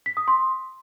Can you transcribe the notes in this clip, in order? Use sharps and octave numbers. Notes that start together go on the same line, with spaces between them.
B6
D#6
C6